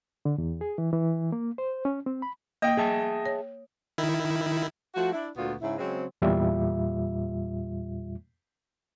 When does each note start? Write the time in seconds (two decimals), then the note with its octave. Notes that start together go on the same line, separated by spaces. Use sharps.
0.25 D3
0.38 E2
0.61 G#4
0.78 E3
0.93 E3
1.32 A#3
1.58 C5
1.85 C#4
2.06 C4
2.22 B5
2.62 A#3 D#5 G5
2.77 G#4 E5 A5
3.25 C#5
3.98 D#3 E4
4.95 F3 A3 F#4
5.12 D4 E4
5.36 D2 A#2 B3 F4 F#4
5.61 G#2 C#3 E4
5.78 C#3 F#3 G#3 C4
6.22 E2 A#2 G3 F4 E5